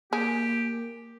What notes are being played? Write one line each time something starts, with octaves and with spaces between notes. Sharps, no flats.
A#3 G4 G#4